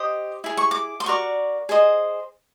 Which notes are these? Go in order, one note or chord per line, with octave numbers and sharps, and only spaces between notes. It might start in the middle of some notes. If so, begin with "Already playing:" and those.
Already playing: G4 C5 D#5 D#6
E4 G#4
C#6
D6
C6
F#4 A#4 D5 C#6
G#4 C5 D#5